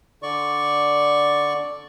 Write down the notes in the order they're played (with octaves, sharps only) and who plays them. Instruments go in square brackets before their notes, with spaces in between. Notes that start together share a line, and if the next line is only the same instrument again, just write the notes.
[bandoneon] D3 D5 C#6